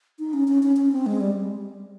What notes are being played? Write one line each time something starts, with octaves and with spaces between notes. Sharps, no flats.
D#4
C#4
C#4
C#4
C#4
C4
G#3
G3